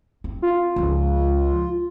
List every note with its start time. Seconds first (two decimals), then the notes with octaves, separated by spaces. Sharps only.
0.24 C4
0.42 F4
0.76 C#2 F3